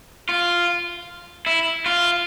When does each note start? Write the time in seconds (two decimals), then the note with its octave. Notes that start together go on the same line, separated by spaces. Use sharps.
0.29 F4
1.46 E4
1.86 F4